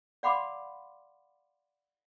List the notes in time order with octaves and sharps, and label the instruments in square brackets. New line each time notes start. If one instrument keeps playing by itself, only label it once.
[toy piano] D5 F5 F#5 B5 C6 D6